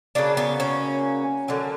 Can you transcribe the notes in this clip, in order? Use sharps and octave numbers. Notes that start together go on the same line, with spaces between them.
C#3 F#3 A#3 D4
B3
C#4
D3 F#3 A#3